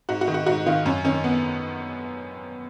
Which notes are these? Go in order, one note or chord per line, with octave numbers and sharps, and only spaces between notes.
G#2 F#4
F#4
D#3
F#4
G#2 F#4
D#3 F4
F#2 C#4
D#3 C#4
B3